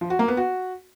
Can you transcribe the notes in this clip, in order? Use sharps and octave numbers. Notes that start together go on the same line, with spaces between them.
F3
F#4
A#3
B3
F#4